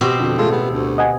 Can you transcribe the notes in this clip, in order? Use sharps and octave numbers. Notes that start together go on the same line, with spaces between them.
B2 C4 F#4 G4
F2 D3 F#4
A1 G#3 F4 A4
B3
D2
D#5 F#5 G#5